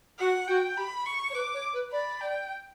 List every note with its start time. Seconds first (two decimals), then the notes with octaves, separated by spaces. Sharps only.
0.19 F#4 F#5
0.48 F#4 G5
0.77 G4 B5
1.06 C#6
1.30 C#5
1.34 B4 D6
1.53 C#5
1.73 B4
1.92 D5 B5
2.21 G5